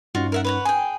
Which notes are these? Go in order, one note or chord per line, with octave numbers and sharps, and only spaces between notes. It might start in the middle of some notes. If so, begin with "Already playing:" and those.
G2 C#4 D#4 F4 F#4
A#4 E5 F#5
B4 C#5 F#5
G#4 G5 G#5